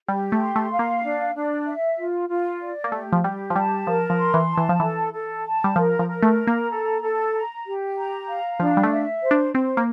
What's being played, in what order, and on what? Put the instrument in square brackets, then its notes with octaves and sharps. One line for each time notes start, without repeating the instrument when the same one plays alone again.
[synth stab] G3 [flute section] G4
[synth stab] A3
[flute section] C6
[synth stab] A3
[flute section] F5
[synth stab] A#3
[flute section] D4
D4
E5
F4
F4
D5
[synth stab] A#3
[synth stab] A3 [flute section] G4
[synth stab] F3
[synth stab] G3 [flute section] G4
[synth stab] F3
[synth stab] G3 [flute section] A5
[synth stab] F3 [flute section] A#4
[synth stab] F3
[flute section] C6
[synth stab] E3
[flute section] A5
[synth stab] E3
F3
[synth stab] E3 [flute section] A4
[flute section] A4
A5
[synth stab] G3
[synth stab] F3 [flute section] A#4
[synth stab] F3
[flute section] A#4
[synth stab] A3
[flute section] A#5
[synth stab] A#3
[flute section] A4
A4
A#5
G4
A#5
F5
[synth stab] F3 [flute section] D4
[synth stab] G3
A3
[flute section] E5
C5
[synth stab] D4
[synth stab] C4 [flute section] C5
[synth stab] A#3